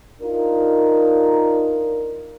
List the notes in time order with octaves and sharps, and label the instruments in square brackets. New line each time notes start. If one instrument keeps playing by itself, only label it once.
[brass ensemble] D4 D#4 F4 A#4